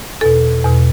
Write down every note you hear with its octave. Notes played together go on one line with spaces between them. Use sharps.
E2 B2 A4
E2 B2